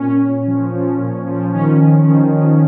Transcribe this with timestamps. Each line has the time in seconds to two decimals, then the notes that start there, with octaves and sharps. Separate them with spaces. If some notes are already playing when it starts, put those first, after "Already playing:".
Already playing: A#2 C#4
0.20 A#2
0.47 F3
0.73 F3
0.99 A#2
1.27 F3
1.53 D#3 C#4
1.79 D#3
2.06 D#3
2.33 D#3